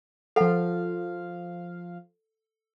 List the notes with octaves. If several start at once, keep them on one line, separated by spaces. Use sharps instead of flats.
F3 A4 F5 F#5